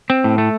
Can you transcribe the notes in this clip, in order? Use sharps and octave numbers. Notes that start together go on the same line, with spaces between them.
C4
A2
A3